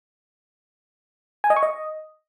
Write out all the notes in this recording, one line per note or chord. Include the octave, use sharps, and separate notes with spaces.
G#5
D#5
C#6
D#5